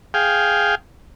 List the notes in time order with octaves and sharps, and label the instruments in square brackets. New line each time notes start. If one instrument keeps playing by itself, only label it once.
[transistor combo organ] G#4 F5 G5